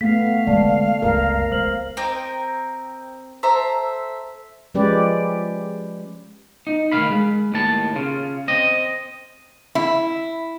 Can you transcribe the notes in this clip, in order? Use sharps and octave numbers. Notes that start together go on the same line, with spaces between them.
A3 B3 F5 B6
D3 G#3 D5 A5
C#2 F#2 A#4
C#2 C5 F6 F#7
C4 A#4 D#5 G5
A4 C5 E5 A#5
F3 G#3 C#4 G4 B4 D5
D#4
D2 D#3 F5 B5
G#3
D#2 A2 A5
C#3 F4
C4 D#5
E4